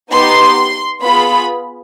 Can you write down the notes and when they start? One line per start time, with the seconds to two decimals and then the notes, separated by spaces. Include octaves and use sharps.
0.12 B3 D#4 G4 C6
1.03 B3 F4 G#4 B5